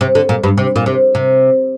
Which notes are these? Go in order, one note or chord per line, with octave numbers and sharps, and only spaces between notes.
C3
D3
A#2
G2
C3
A#2
C3
C3